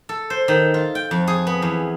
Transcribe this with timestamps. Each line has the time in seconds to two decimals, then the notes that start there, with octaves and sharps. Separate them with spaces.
0.09 A4
0.30 C5
0.48 D#3
0.74 F4
0.95 G5
1.11 F2
1.28 G#4
1.47 B3
1.62 E2